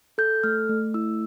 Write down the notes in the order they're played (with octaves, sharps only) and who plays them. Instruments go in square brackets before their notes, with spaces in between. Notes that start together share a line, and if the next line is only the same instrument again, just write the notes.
[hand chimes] A4 G6
A3 F6
A3
E4 E6